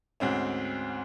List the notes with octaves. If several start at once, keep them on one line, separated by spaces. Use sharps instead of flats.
D2 G#2 C4 C#4